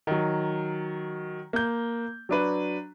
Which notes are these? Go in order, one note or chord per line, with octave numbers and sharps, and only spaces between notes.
D#3 F#3
A#3 G6
F#3 D4 B4